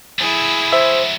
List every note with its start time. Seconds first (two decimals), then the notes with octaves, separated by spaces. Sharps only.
0.19 F#3 A3 E4 G#4
0.72 C5 E5